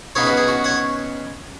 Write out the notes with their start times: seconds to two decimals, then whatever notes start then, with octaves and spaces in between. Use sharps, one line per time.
0.15 C#3 B3 D#4 G#4 C#5
0.27 F#4 B4
0.37 G#4
0.48 F#4
0.64 C#5 F#5